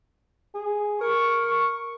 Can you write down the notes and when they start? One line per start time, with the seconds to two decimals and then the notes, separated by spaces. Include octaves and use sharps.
0.54 G#4
1.01 A#4 C#6